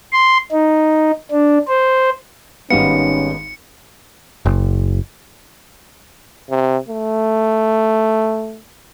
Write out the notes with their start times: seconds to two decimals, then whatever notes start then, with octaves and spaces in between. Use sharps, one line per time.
0.13 C6
0.51 D#4
1.31 D4
1.68 C5
2.70 G#1 G3 B3 C#4 D#4 F5 C#7
4.45 F#1
6.50 C3
6.88 A3